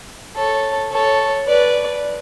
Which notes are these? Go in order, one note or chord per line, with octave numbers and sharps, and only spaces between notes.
A4 C#5
A4 C#5
B4 D5